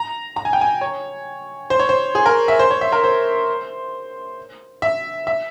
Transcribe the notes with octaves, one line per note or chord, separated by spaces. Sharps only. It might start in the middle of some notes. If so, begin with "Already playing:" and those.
Already playing: A#5
A#5
G#5
G5
G#5
C#5
C5
C#5
C5
G#4
A#4
E5
C5
C#5
E5
A#4
C5
E5
E5